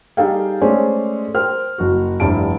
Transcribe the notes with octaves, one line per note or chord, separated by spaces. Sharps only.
G3 D#4 G#4 A4 F5 G5
G#3 A3 C#4 G#4 C5 D5
A#4 C5 G5 F6
F#1 F#4
F1 G2 E4 A5 D7